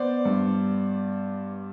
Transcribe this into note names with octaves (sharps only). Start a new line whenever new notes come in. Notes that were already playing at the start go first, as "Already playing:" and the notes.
Already playing: B3 C5 D5
G2